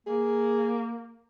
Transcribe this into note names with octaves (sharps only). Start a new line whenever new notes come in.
A#3 G#4